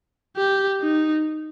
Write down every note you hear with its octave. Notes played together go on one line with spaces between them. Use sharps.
G4
D#4